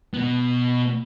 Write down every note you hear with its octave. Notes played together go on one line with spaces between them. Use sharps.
B2 B3